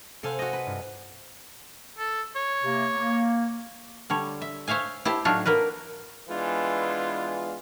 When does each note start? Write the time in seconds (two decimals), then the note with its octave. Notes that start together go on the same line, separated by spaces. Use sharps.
0.23 C3 A4 C5 F5 F#5 G#5
0.39 F#4 D#5
0.53 B4
0.67 G2 F4
1.99 A4
2.36 C#5
2.63 C3 A#3
2.93 A#3
4.10 D3 G3 C#5
4.42 E5
4.68 C5 C#5 E5 F5 G#5
5.05 E4 G4 C5 A5
5.25 A2 F#3 D4 D#4 F4 C#5
5.46 F#3 A#3 A#4 B4
6.29 E3 G#3 B3 D4 F4